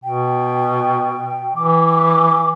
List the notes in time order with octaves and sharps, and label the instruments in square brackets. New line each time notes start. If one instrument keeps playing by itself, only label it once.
[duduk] B2 [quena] G5
[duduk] E3 [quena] D6
[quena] D6